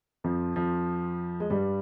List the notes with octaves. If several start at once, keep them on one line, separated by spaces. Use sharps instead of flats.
F2 F3
F2 F3
G#3
G2 G3